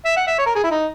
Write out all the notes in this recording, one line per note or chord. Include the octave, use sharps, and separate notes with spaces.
E5
F#5
E5
C#5
A#4
G#4
E4
D#4